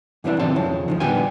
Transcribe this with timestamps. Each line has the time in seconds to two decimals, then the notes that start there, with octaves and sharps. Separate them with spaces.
0.24 G#2 C3 E3 G3 D4 E4
0.39 B1 D#3 F3 C4 A5 C6
0.56 F2 C#3 F3
0.88 D3 D#3 F3
1.00 A#2 G3 B3 D4 G5 G#5